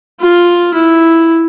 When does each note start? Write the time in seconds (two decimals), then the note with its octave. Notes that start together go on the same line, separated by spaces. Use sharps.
0.20 F4
0.74 E4